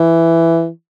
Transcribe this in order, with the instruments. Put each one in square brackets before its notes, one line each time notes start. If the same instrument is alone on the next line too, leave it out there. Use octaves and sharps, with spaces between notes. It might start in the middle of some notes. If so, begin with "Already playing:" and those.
Already playing: [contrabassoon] E3